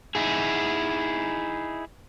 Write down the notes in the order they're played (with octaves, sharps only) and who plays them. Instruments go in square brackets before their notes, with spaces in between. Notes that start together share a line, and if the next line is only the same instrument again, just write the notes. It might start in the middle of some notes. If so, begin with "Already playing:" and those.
[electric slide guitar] D#4 E4 G#4